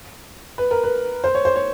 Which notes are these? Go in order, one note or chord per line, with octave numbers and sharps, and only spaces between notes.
B4
A#4
B4
C5
C#5
C5
C#5